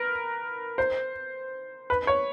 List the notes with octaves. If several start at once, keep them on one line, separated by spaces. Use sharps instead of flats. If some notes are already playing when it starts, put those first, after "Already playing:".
Already playing: A#4 B4
C5
B4
C#5